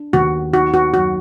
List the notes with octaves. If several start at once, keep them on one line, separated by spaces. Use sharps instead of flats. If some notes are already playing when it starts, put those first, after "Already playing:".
Already playing: D4
D#2 F#4
D#4 F#4
F#4
F#2 F#4